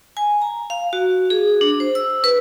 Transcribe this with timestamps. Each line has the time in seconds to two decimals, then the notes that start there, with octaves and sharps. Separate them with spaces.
0.17 G#5
0.42 A#5
0.70 F5
0.93 F#4
1.30 G#4
1.61 D4
1.80 C5
1.95 E6
2.24 B4